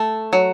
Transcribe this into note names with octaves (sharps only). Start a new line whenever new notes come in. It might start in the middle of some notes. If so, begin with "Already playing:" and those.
Already playing: A3
F#3